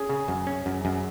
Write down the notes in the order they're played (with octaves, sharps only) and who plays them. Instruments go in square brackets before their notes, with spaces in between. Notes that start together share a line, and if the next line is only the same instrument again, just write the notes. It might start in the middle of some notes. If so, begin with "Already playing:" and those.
Already playing: [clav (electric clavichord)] C#4 [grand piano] G#4
[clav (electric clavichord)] C#3
F#2
C#4
F#2
F#2